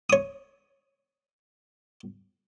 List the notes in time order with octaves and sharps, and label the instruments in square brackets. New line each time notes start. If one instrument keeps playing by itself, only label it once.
[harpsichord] C#5 D#6